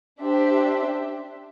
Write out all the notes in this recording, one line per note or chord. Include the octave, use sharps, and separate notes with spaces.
D4 G4 C5 E5